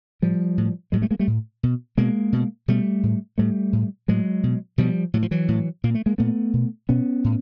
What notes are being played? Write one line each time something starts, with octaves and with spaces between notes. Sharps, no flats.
A2 F3 G3
A2
A2 F#3 G#3
G3 A3
G#3 A#3
G3 A3
A2
B2
B2 G#3 A#3
B2
B2 G3 A3
A2
A2 G3 A3
A2
A2 F#3 G#3
B2
B2 F3 G3
A2 F#3
F3
E3 F#3
A2
A#2 A#3
A3
G#3 A#3
A#2 A3 B3
B2
B2 B3 C#4
A2